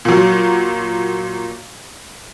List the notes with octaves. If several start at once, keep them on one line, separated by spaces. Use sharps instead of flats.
A#2 F#3